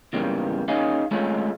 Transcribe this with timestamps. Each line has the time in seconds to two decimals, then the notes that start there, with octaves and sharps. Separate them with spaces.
0.13 E2 G#2 C#3 E3 G3 A#3
0.68 A#3 C#4 D#4 G#4 F5
1.11 G#3 A3 C4 C#4 F4 A4